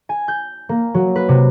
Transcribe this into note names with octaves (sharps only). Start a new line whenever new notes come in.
G#5
G6
A#3
F#3
B4
C3